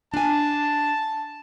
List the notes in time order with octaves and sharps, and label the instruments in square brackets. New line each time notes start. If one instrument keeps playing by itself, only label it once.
[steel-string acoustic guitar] D4 G#5 [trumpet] A5